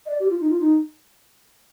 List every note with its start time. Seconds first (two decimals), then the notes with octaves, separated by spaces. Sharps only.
0.06 D#5
0.10 D5
0.20 G4
0.30 F4
0.41 D#4
0.50 F4
0.60 D#4